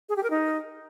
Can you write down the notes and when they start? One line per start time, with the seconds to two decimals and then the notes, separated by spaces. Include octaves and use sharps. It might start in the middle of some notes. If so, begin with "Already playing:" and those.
0.09 G#4
0.16 G4
0.23 A#4
0.30 D#4